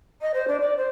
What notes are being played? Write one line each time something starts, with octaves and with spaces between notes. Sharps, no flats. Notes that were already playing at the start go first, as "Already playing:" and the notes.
D#5
C5
D4
D5
C5